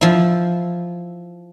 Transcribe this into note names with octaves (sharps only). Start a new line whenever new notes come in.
F3 E4